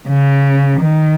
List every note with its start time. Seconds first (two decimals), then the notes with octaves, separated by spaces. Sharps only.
0.08 C#3
0.80 D#3